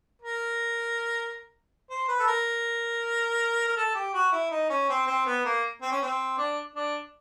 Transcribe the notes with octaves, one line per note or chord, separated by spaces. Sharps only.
A#4
C5
B4
A4
A#4
A#4
A4
G4
F#4
E4
D#4
C#4
C4
C4
B3
A#3
C4
C#4
C4
D4
D4